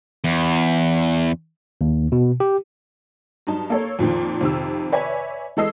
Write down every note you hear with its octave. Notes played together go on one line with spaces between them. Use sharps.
E2
D#2
B2
G4
G2 F#3 D#4 A5
A#3 A4 C#5
F2 A#2 D#3 F3
F2 C3 D#3 E6
B4 C#5 D5 E5 G#5
E3 G#3 A4 D#5 E6 C7